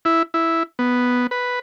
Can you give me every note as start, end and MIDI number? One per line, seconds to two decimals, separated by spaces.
0.05 0.23 64
0.34 0.63 64
0.79 1.27 59
1.31 1.59 71